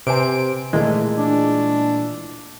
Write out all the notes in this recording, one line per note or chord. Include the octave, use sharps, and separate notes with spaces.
C3 B4 C5 G#5 D7
A#2 E3 G#3 A3 E4
D4